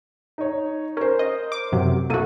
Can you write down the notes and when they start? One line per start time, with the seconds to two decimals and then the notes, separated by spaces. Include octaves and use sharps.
0.38 D#4 C#5
0.97 C#4 A#4 C5
1.19 D#5
1.52 D6
1.72 F#2 C3 F#3
2.10 C2 A#3 F#4 A4 D#7